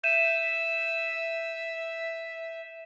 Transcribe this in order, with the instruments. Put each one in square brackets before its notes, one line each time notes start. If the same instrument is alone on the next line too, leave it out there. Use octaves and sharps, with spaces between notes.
[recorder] E5 [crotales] G6 D#7 E7